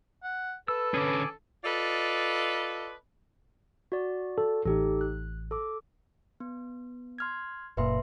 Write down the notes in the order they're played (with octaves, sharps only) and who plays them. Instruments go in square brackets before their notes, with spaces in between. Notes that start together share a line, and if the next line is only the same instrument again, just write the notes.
[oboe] F#5
[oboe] A4 [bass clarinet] B4 [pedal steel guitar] E6
[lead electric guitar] D3 C#4 [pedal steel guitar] G#4 D6
[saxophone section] F4 A4 B4 D5 D#5
[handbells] F#4 D5
[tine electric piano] A4
[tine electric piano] A1 [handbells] D#4 G4 A4
[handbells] F#6
A4 D6
[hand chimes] B3
C6 F6 G#6
[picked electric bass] F#1 A#2 [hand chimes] B4 E5 C6